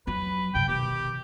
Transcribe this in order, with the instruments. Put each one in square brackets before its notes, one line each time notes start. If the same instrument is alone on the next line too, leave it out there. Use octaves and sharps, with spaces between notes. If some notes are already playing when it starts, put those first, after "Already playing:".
[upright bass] F2 F#3 [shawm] B4
[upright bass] G2 C3 [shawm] G5
[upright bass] B2 D#3 [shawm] G4